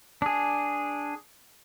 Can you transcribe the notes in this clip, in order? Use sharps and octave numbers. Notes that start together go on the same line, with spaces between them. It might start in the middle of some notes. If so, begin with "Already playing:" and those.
D4 G#4